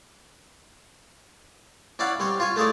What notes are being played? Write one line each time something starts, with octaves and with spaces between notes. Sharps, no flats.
C#4 E4 D5 F5 F#5 B5
G3 C4 C#5
F4 C#5 G#5
A3 E4 G#4 C#5 D5